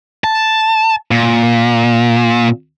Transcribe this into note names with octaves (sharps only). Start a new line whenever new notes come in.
A5
A#2